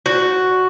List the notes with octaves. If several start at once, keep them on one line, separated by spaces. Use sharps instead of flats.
F#4